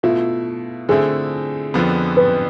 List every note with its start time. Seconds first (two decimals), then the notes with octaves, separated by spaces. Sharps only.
0.03 B2 A3 E4 F4
0.89 D3 A3 C4 E4 G#4
1.74 F2 D3 F3 B3
2.17 B4